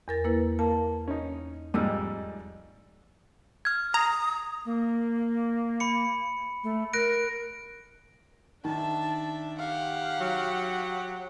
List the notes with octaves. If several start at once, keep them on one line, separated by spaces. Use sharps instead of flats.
E2 A#4 A6
A#3 E4 B4
A#3 A5
C#4 D#4
F2 G#2 G3 D#5 E6 F6
F6 G#6
A#5 D#6
A#3
B5 C#7
A3
A#4 F#6 A#6 D7
D#3 D4 E5 A5
G4 F5 F#5
F#3